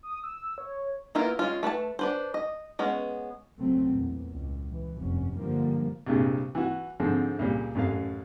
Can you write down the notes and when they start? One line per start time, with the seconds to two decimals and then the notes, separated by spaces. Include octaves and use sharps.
0.03 D#6
0.23 E6
0.58 C#5
1.15 A#3 B3 E4 F4 A#4
1.39 G#3 C#4 F4
1.63 A3 B4 C#5 A5
1.99 D4 B4 C5
2.34 D#5
2.79 G#3 B3 C#4
3.59 B1 C#3 F#3 A3 C4
3.89 E2 A#2
4.31 C#2
4.68 E3
4.99 F1 G2 C#4
5.35 G2 D3 F3 G3 A#3
6.06 C2 G2 A#2 G#3
6.55 E3 F#4
7.00 G#2 D3 F3 C4
7.39 C#2 A#2 G3
7.75 A1 F#2 A3 F5